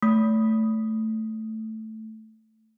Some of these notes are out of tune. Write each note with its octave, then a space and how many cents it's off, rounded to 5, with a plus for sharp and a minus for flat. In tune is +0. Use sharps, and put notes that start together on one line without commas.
A3 +0 D#6 +0